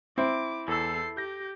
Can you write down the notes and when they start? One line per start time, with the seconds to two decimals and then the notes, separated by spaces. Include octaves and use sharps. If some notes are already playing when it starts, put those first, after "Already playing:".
0.18 C4 E4 D6
0.68 E2 A4 E6 C7
1.17 G4 G6 A#6